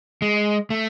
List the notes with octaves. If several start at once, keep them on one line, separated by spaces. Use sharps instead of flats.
G#3
A3